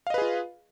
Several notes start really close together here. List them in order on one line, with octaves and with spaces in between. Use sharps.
F5 D#5 B4 G#4 F4